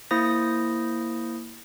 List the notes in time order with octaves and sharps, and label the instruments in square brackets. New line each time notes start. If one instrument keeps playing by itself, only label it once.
[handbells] A#3 E4 C5 D#6 A#6